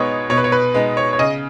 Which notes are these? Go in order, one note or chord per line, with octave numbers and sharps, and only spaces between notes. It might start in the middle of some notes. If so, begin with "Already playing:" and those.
Already playing: B2 G#3 B3 D#4 C#5
B2 C#5
B4
C#5
B4
G#3 B3 D#4
C#5
C#5
C#3 D#5